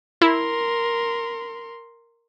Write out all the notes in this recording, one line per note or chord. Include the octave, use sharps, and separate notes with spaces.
E4 A#4 C6